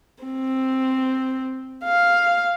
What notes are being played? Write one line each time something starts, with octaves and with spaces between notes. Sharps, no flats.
C4
F5